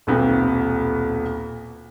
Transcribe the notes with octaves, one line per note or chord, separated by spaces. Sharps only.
D#1 B1 B3 C4